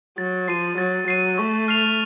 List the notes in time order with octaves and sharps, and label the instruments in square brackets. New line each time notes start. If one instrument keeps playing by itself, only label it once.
[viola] F#3 [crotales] A6
[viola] F3 [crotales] C7 D#7
[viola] F#3 [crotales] A6
[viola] F#3 [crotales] C7 D#7
[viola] A3 [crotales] C#6
[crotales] F6 C7 F7